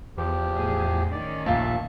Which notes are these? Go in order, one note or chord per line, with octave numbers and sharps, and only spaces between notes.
E2 F3 G4
A2 G#4
D#3 C#4 D5
A#1 D#2 A#2 E5 A5